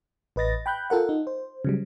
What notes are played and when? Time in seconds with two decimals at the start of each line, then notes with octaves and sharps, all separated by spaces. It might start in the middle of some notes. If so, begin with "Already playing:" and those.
0.36 A1 B4 D#5 A6 A#6
0.66 G5 B5 F#6 G6
0.90 F4 A4 A#4 F#5
1.09 D#4
1.27 C5
1.65 C#3 F#3 G3